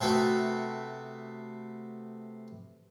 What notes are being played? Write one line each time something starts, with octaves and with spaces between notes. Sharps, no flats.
C3 A3 B3 F#4